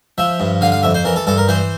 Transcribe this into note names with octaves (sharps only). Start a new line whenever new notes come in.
F3 E5
G2
D3 F5
F5
F2 E5
C5
E3 A#4
A4
G2 A4
A#4
E3 C5